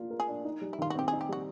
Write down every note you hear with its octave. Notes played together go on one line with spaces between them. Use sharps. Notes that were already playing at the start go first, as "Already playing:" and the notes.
Already playing: A#3 D4 F4
A#4
G#4
D4
D#4
G3
E4
D#3 F4
F#4
C4 G4
D#4 G#4
G4
G3 F#4